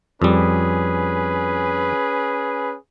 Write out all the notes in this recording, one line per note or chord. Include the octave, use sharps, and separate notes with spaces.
F2 G3 C#4 G#4 B4